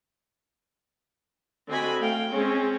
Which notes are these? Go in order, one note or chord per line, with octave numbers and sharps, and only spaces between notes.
D3 C4 F#4 D#5 G#5 B5
A3 F5 G5
G#3 C4 C#4 G#4